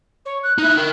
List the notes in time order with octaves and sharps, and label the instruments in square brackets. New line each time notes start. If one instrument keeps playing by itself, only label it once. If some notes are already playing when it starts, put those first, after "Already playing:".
[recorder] C#5
F#6
[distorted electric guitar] D#4 E4 [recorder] F#6
[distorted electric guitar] A#4 G5